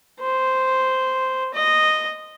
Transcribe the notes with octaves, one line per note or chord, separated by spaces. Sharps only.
C5
D#5